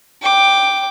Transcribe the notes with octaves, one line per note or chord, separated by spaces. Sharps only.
G5 D6